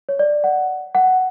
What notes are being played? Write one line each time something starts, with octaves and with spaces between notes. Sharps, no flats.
C#5
D5
F#5
F#5